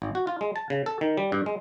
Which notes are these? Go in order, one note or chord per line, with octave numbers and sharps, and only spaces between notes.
G#1
F#4
F4
G#3
A5
C#3
A4
D#3
G3
G2
G#3